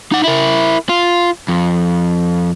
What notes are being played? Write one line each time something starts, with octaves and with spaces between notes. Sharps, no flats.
D#4 F#5
E4 A#4
F4
F2